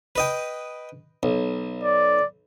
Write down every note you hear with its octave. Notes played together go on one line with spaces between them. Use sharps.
B4 D#5 G5
B1
D5